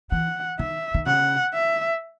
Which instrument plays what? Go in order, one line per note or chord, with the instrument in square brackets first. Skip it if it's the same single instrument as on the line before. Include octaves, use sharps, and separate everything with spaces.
[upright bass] E3 [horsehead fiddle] F#5
[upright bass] D#3 [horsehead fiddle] E5
[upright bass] D#3
[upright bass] C#3 [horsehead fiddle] F#5
[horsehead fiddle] E5